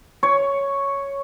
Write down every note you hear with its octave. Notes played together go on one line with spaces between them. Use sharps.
C#5